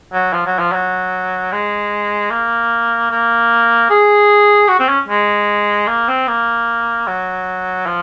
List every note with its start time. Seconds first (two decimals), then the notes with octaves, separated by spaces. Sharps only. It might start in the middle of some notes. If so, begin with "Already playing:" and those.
0.13 F#3
0.33 F3
0.46 F#3
0.59 F3
0.73 F#3
1.52 G#3
2.31 A#3
3.11 A#3
3.90 G#4
4.69 F#4
4.79 C4
4.88 C#4
5.08 G#3
5.87 A#3
6.08 C4
6.28 A#3
7.07 F#3
7.86 F3